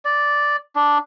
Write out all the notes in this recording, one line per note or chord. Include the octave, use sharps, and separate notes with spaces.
D5
D4